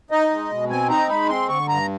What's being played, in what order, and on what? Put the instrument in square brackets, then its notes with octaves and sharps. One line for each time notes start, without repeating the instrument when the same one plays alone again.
[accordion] D#4 D#5
G#3
B2
C4 G#5
D#4 A#5
G#3 B5
C4 C6
D3 C#6
G2 A#5